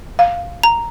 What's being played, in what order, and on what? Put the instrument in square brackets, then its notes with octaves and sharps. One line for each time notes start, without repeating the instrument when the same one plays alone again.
[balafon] F5
[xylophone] A#5